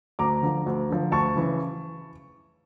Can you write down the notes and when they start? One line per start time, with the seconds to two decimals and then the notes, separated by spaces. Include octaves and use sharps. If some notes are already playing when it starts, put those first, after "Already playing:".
0.19 D2 A#5 D6
0.42 D3 F3
0.66 D2
0.90 D3 F3
1.12 D2 A5 C#6
1.36 C#3 E3